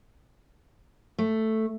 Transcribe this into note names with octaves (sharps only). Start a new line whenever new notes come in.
A3